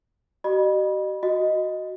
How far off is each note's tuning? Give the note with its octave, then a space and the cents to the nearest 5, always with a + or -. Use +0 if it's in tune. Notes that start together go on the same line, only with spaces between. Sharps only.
F#4 +45 D#5 -35 B5 -25
F#4 +0 D#5 +0